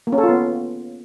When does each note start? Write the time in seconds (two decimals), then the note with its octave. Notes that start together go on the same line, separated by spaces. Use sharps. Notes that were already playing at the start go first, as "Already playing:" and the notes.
0.07 A#3
0.13 C#4
0.18 A4
0.23 F4
0.29 B3